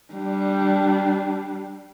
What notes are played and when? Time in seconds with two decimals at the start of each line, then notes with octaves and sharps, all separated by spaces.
0.13 G3 D4